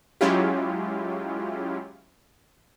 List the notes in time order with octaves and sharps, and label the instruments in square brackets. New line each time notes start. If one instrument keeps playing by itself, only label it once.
[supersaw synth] F#3 G#3 C#4 E4 F4 G4